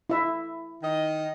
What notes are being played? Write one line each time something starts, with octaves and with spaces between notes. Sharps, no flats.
E4 E5
D#3 D#4 D#5